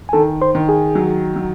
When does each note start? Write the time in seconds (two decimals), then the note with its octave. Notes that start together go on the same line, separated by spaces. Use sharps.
0.09 G#5
0.13 D#3 A4 A5
0.42 C5 C6
0.55 D#3
0.69 G#4 G#5
0.95 F#3
1.36 F#3